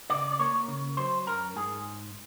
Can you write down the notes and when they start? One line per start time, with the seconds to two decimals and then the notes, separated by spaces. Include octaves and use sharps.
0.10 C#3 D5
0.32 D5
0.39 A#3 C#5
0.68 C#3
0.97 F#3 C5
1.26 F#2 A#4
1.56 G#2 G#4